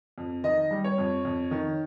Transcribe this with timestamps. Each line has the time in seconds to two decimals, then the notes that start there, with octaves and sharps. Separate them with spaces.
0.18 F2
0.44 D#3 D#5
0.71 G3
0.84 C#5
0.98 F2
1.25 F2
1.51 D#3